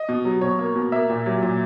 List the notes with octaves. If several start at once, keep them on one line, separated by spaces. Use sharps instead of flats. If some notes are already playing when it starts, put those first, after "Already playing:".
Already playing: D#5
B2
F#3
B2 C#5
A#3
B2
A#3 E5
A#2
F#3
A#2